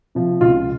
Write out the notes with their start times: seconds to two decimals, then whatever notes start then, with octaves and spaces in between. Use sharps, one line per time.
0.15 C3 F3
0.41 C#2 F4